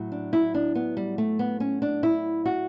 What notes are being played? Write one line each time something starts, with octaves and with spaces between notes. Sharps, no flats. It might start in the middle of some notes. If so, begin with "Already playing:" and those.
Already playing: A2 F#3
D4
E4
D4
B3
G3
A3
B3
C#4
D4
E4
F#4